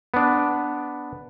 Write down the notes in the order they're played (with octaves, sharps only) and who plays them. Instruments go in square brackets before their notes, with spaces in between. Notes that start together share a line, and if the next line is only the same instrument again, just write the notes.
[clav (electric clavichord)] B3 D4